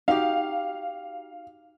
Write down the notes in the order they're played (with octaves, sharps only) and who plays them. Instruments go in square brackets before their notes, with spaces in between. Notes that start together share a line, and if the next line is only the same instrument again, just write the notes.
[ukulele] D#4 F#4 G4 [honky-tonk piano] F5